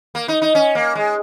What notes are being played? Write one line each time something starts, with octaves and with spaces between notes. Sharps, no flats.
A#3
D#4
D#4
C#4
A#3
G#3